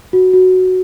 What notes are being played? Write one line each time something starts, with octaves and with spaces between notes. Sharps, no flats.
F#4
F#4